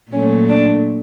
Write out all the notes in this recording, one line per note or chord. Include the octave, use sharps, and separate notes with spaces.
A#2 F#3 A3 C#4
D4